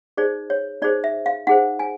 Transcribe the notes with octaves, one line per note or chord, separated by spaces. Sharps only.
D#4 G#4 C5 D5
C#5
D#4 G#4 C5 D5
E5
F5
D#4 G#4 C5 F#5
G#5